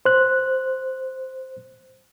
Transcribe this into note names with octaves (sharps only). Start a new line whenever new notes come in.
C5 F#6